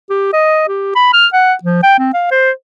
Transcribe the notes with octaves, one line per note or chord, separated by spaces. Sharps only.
G4
D#5
G4
B5
F6
F#5
F3
G5
C4
F5
C5